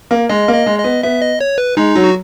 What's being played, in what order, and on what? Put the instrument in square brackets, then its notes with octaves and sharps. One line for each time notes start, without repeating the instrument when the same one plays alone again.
[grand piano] A#3
[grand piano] G#3 [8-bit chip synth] D#5
[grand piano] A#3
[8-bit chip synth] D#5
[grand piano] G#3
[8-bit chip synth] D#5
[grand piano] B3
[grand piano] B3 [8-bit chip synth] E5
[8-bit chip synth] D#5
C#5
B4
[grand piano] G#3 [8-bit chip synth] D#4
[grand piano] F#3
[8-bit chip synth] F#4